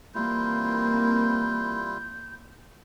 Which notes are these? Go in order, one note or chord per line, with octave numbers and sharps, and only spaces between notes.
E3 G3 A#3 C4 E4 F4 G6